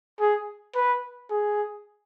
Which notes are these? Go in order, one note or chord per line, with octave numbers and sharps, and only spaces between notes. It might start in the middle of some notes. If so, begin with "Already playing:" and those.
G#4
B4
G#4